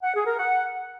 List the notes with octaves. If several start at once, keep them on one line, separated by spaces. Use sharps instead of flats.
F#5
G#4
A#4
F#5